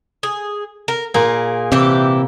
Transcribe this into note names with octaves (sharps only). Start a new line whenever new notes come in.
G#4
A#4
A#2 A#3 G#4
C3 E3 E4 G4